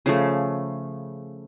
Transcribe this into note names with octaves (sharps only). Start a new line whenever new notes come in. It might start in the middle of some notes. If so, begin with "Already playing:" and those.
C#3 F3 A3